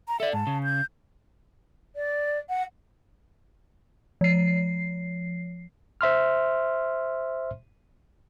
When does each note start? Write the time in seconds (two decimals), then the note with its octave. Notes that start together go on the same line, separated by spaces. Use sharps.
0.08 A#5
0.20 A4 D5 E5
0.33 G#2 A5
0.47 C#3
0.64 G6
1.95 D5
2.49 F#5
4.21 F3 C7
6.01 C5 E5 C6 F6